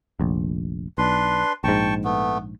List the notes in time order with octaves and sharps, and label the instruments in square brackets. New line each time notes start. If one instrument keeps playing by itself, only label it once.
[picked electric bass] F1 A#1
[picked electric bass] B1 [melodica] D4 B4 C6
[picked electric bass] A#1 G#2 [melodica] G5 A5 C#6
[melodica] A3 B3